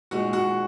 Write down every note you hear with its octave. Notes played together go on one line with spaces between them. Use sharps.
A#2 G#3 D#4 F#4
F#4